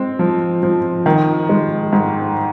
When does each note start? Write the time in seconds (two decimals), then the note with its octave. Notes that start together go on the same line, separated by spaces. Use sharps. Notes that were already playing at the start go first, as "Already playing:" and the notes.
Already playing: G#3 C4
0.19 F3
0.63 F3
1.06 D#3
1.49 G#3
1.93 G#2